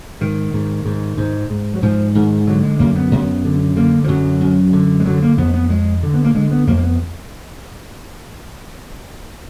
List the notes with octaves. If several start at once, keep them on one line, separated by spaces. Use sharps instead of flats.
G#2 D#3
G#2
G#2
G#2
G#2
F#3
G#2 F3
G#2 D#3
D3 F#3
G#3
F#2 A#3
B3
F#2
D3
D3 A#3
F3
F#2 F#3
F#2
D3
G#3
D3 F#3
A#3
F2 B3
B3
F2 G#3
D3
B3
A#3
D3 G#3
B3
F2 A#3
A#3
B3